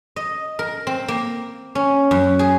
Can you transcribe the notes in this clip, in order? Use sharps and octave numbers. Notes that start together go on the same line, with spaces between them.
D#5
A#4
C4
A#3
C#4
F#2
G#4